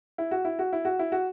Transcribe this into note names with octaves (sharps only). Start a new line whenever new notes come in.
E4
F#4
E4
F#4
E4
F#4
E4
F#4